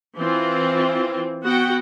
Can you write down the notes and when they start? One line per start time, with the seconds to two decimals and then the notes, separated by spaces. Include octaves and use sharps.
0.17 E3 C4 F4
1.43 B3 F#4 F#5 G5